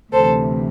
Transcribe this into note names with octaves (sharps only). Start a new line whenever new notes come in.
D2 C3 E3 A4 C5